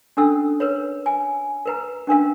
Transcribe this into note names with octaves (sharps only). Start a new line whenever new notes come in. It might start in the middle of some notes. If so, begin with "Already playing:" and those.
C#4 D4 A4 E6
A#4 B4 C#5
G#5
A#4 B4 A#5
C#4 D4 A#4 F5